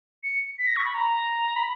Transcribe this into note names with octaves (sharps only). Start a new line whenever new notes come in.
C#7
B6
A#6
C#6
B5
A#5
B5